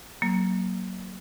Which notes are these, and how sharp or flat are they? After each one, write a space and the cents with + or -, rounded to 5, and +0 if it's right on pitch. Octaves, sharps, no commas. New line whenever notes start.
F#3 +15 A#3 +0